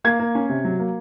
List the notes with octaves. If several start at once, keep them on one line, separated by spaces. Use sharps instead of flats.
A#3 G#6
A#3
C#4
C3
F#3
A#3